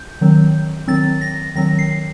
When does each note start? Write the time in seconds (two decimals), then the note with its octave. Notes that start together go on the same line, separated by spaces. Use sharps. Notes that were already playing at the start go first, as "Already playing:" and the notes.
Already playing: G6
0.21 D#3 F#3 C4
0.88 D#3 F#3 C4 A6
1.21 A#6
1.55 D#3 F#3 C4 A#6
1.79 C7